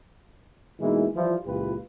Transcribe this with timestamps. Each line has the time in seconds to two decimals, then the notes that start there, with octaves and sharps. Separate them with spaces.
0.79 B2 E3 G#3 A#3 D#4 E4
1.14 E3 F3 G3 E4 F4
1.45 C#2 A#2 E3 F4 G4 B4